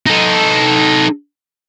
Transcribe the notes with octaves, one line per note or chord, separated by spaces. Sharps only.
D#4 A4